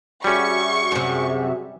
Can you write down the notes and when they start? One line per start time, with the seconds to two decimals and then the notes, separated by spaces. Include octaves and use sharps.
0.24 G3 C#4 F#4 G#4 E5 C#6
0.92 F#2 C3